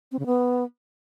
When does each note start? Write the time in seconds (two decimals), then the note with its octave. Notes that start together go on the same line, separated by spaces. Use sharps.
0.12 C4
0.19 C#3
0.26 B3